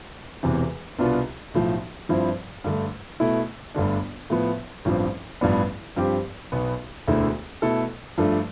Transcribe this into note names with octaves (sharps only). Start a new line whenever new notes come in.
E1 E2 C3 E3
C2 B2 B3 D4 F4
B1 A2 F3
G2 F3 C4 E4
G2 D3 A3
B2 A3 E4
G1 G2 D3 A3 D4
A2 F3 B3
A1 G2 F3 C4
A1 G2 F3 B3 D4
G2 F3 C4 G4
B1 B2 B3
E1 D2 D3 A3 E4
B2 A3 E4 A4
G2 F3 A3 D4 A4